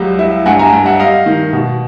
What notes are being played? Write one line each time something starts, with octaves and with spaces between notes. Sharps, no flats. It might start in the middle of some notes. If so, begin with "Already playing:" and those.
Already playing: C#2 F#3 G3
E4
G2 F#5 G#5
G#5 A#5
G2
E5 F#5
G3 D#5 F5
D#3
B2